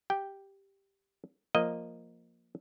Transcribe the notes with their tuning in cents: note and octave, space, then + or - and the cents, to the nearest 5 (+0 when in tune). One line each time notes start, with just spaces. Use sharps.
G4 +0 G5 +0
F3 +0 A#3 +0 D#5 +0